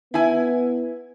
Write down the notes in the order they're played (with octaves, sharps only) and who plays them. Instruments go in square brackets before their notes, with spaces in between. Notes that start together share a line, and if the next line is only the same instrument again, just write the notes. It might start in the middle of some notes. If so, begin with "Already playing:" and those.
[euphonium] B3 [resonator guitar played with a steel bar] E4 G#5